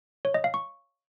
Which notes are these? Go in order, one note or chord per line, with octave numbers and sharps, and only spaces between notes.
C#5
D#5
F5
C#6